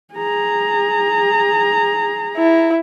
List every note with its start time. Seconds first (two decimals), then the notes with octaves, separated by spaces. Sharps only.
0.14 G#4 A#5
2.37 E4